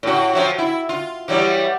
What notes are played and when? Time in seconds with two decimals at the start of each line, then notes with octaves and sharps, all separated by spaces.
0.03 A2 F#4
0.33 F3 F#3 F#4
0.58 E4
0.89 F4
1.28 E3 F#3 G3